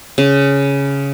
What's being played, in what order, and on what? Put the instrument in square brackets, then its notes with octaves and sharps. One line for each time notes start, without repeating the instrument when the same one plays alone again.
[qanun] C#3